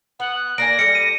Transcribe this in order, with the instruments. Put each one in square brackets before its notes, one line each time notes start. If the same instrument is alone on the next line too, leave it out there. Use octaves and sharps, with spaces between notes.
[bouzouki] B3 [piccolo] F#5
[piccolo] F#6
[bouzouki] A#3 D4 G#5 [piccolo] A#6 [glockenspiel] D7
[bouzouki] G3 E4 A4 [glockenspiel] C#7
[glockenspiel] D#7